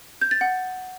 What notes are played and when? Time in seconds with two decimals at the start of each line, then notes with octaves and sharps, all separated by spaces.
0.21 G6
0.31 A6
0.41 F#5